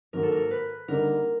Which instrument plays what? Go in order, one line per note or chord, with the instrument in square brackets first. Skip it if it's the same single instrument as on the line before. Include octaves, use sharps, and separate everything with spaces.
[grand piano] G#2 D#3 F#3 A#3 [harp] A#4
[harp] A4
A#4
B4
[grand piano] D3 G3 A#3 D#4 [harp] A#4